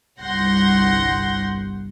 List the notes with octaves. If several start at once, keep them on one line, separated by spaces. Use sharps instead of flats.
G1 C2 F#5 C6 G6 A#6